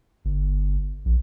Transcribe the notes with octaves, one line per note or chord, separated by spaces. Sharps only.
G1
A#1